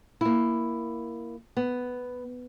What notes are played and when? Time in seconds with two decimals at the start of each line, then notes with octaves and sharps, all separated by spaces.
0.21 A#3 E4
1.57 B3